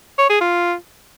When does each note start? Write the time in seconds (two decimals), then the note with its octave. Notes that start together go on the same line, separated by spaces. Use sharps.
0.18 C#5
0.30 G#4
0.41 F4